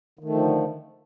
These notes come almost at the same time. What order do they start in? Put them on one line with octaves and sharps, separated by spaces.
D#3 A3 F3 D3